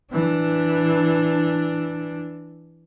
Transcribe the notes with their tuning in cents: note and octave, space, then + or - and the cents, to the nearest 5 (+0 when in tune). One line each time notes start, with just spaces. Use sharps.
E3 +0 D4 +0